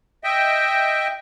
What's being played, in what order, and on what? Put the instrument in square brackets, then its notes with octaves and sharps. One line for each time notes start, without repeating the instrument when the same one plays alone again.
[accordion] D#5 E5 G5